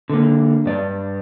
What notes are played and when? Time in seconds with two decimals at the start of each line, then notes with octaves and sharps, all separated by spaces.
0.10 D3 A#3
0.66 G2 D5